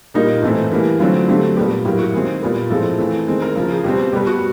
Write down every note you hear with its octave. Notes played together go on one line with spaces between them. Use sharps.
A#2 G3 A#3 D#4
A2 E3 A3 C4
E3 G3 A#3
D3 F#3 A3 C4 F4
D3 F#3 A3 C4 G4
A#2 G3 B3 G4
A2 F#3 A#3 G4
F#4
D#3 G#3 C4 G#4
A#2 G3 B3
A2 F3 G#3 C4 A4
E3 A3 C4
D#3 G#3 C4
A#4
C#3 F3 A#3 A#4
G#4
B2 G3 C4 G4
B2 G3 B3 G4
F#4